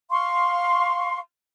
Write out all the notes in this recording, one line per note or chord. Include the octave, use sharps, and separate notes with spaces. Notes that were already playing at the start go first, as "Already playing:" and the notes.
F5 C6 C#6